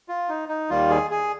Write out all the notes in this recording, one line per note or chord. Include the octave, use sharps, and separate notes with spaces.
F4
D#4
D#4
D#2 D#3 G3 F4
G#4
G#4